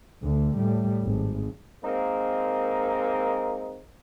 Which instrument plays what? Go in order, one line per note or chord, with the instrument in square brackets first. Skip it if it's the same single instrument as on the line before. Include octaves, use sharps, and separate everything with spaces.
[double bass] D2 D3
A2 G3
G#1
[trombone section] G#3 A#3 C4 D#4 A#4